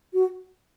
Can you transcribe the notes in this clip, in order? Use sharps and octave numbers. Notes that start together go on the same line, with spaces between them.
F#4